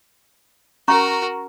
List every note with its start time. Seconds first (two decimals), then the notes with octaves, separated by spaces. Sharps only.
0.88 C#4 F#4 A#4 A#5 C#6